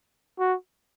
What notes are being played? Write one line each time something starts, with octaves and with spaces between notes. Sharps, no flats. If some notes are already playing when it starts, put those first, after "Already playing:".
F#4